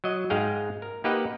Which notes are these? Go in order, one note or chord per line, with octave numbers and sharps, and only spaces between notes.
F#3 D#5
G#2 G#3 G#4 F5 G5
A#4
A#3 D#4 G4 B4 D#5 F#5